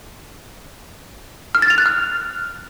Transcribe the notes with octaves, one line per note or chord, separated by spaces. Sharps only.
F6
A6
F7
F#6
F6